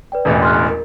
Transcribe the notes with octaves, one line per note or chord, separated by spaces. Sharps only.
B4 D5 G5
E1 A1 E2
C6 F6 F#6
A#4